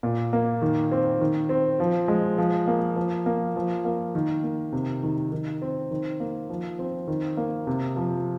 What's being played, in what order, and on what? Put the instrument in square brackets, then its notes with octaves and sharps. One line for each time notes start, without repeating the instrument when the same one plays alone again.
[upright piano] A#2
A#3
D#3
C4
D#3
C4
F3
G#3
F3
A#3
F3
A#3
F3
A#3
D#3
A#3
C3
D#3
D#3
C4
D#3
A#3
F3
C4
D#3
A#3
C3
F3